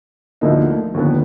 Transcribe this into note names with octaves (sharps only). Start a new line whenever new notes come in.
D2 D3 F3 A#3 D#4
D#2 D3 F3 B3